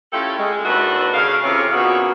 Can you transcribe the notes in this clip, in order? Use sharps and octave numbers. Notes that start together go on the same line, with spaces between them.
C#4 E4 F4 G4 A4
G#3
D#2 D4 E4 F#4 A4 B4
C#3 F5
F2 C3 E3 C#4
A#2 C#3 B3 D#4 F4 F#4